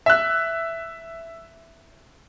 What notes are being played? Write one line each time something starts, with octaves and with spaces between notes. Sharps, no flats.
E5 F#6